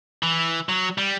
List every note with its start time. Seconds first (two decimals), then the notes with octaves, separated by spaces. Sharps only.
0.23 E3
0.69 F#3
0.98 G3